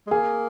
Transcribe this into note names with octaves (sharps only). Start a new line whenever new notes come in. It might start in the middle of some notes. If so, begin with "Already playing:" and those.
G#3
A#3 G#4